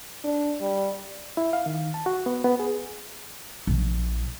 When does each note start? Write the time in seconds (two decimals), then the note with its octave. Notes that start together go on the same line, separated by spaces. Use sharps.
0.24 D4
0.61 G3
1.37 E4
1.53 F5
1.66 D#3
1.94 A5
2.06 F#4
2.26 B3
2.44 B3
2.59 G#4
3.67 A#1 F3